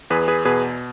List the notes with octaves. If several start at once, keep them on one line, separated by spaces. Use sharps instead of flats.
E2 G#4 B4
G#4 B4
B2 G#4 B4